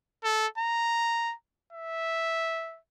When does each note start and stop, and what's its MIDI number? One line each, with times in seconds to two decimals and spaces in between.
0.24 0.47 69
0.58 1.34 82
1.73 2.79 76